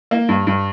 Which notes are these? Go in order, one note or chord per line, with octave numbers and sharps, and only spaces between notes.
A#3
G2
G2